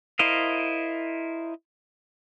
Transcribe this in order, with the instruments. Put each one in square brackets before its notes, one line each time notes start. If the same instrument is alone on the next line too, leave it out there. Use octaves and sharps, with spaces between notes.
[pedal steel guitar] E4 A#4 C5 D#5 F5